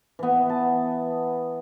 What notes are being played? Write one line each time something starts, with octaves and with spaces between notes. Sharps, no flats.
E3 B3
A5